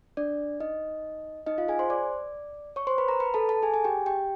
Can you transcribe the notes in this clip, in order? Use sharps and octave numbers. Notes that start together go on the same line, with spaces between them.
D4 D5
D#4 D#5
D#4 D#5
F4 F5
G#4 G#5
C5 C6
D5 D6
C#5 C#6
C5 C6
B4 B5
A#4 A#5
B4 B5
A4 A5
A4 A5
G#4 G#5
G#4 G#5
G4 G5
G4 G5